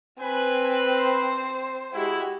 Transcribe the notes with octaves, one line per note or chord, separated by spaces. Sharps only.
C4 B4 G#5
C5
G#3 E4 F#4 G4